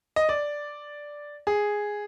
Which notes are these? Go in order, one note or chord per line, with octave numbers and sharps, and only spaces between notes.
D#5
D5
G#4